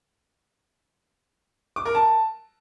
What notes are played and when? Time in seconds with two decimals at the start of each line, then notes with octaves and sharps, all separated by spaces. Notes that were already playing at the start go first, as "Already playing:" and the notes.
1.76 D6
1.85 A#4
1.95 A5